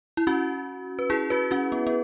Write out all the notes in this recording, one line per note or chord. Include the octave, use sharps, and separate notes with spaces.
E4
C#4 F#4
B4
E4 G#4
F#4 B4
C#4 F#4
B3
B3